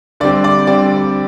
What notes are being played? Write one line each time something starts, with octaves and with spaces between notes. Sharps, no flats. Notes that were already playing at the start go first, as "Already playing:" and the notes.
D3 G3 C4 D5
D5
D3 G3 C4 D5